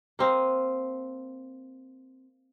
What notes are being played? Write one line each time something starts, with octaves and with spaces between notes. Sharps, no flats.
A#3 C4 D#5